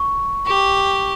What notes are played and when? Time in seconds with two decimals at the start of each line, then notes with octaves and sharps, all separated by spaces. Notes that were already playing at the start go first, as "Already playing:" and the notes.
Already playing: C#6
0.47 G4 C#6